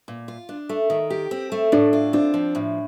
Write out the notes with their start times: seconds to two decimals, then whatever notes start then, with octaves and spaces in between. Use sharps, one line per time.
0.08 A#2
0.28 F4
0.49 D4
0.69 A3
0.90 D#3
1.10 G4
1.31 C4
1.52 A3
1.72 A2 D4
1.93 F4
2.13 C4 D4
2.34 F3
2.55 A2